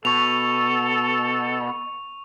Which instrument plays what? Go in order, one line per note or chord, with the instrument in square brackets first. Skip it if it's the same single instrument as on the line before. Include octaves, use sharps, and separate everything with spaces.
[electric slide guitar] B2 [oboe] A4 [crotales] C#6 F7